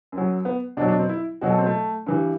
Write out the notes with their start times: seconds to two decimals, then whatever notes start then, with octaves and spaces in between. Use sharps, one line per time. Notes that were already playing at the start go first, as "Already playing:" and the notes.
0.12 F#2
0.18 F#3
0.45 B3
0.77 B2 D4
0.81 F#3
0.88 D4
0.99 C4
1.09 E4
1.41 B2 F#3 F#4
1.50 A4
1.58 C4
1.66 A3
2.06 G2 E3 G3